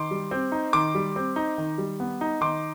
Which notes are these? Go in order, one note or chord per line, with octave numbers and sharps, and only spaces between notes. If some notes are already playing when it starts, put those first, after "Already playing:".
Already playing: D#3 C6 D6
G3
C4
D#4
D#3 C6 D6
G3
C4
D#4
D#3
G3
B3
D#4
D#3 C6 D6